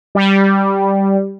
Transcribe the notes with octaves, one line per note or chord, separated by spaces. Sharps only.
G3